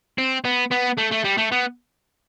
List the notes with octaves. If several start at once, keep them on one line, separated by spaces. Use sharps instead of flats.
C4
B3
B3
A3
A3
G3
A3
B3